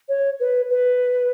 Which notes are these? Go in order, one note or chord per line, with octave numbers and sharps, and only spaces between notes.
C#5
B4
B4